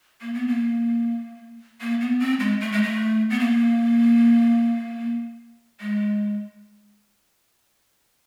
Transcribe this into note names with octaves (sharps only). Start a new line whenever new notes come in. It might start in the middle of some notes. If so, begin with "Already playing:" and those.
A#3
B3
A#3
A#3
B3
C4
G#3
A3
G#3
A3
B3
A#3
G#3